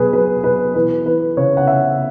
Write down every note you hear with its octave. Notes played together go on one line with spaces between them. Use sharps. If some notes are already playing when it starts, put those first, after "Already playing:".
Already playing: B2 F#3 G#4 B4
F#3 B4
B2 B4
E3 B4
E3 B4
C#3 C#5
F#5
C#3 E5